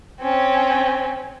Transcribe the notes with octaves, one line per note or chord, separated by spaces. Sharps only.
C4 C#4